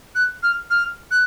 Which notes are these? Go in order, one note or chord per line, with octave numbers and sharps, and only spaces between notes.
F#6
F6
F6
F#6